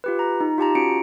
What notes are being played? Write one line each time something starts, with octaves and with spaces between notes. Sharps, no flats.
F4 G4 B4
A#5
D#4
F4 G4 A5 A#5
C#4 F4 F#4 C#7 D7